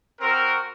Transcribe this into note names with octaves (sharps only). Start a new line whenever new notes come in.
C4 F#4 A#4